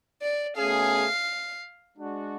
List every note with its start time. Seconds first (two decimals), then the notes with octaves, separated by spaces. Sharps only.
0.22 D5
0.57 B2 A3 C#4 G#4 F5
1.97 G#3 D4 F#4